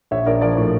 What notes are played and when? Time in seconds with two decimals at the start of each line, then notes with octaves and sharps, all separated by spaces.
0.11 A#1 C#5 E5
0.26 A#1 A#4 D5
0.41 F3 A#4 D5
0.57 A2